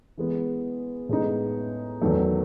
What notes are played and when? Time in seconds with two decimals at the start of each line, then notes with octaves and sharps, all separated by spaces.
0.18 E3 G#3 B3
1.09 A2 G#3 B3 D#4
2.01 E2 D#3 F#3 A3